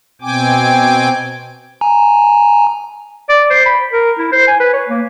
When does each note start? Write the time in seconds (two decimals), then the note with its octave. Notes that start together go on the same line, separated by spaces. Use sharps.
0.22 B2 C4 G5 G#5 D6
1.81 G#5 A#5
3.29 D5
3.50 C5
3.66 B5
3.93 A#4
4.19 E4
4.32 C5
4.47 G#5
4.60 B4
4.73 C#5
4.89 A#3